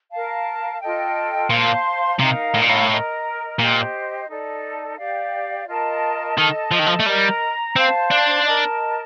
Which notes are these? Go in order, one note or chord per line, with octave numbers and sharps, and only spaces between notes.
A#4 F5 A5
F4 A4 D#5 G5
A#2 C5 F5 A5 C6
C3 D#4 A#4 F5 A#5
A2
A#2
A2
A#4 D#5 A#5
A#2 G4 C5 D#5
D#4 A4 D5
G4 D5 F5
F4 A#4 D#5 A5
D#3 A4 D#5 A5
F3
D#3
F3
A3
G3 A#4 D#5 A#5
C4 C5 F5 A5
D4
A#4 D#5 A5